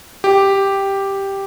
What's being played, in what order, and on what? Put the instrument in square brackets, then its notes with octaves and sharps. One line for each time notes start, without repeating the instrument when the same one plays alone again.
[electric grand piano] G4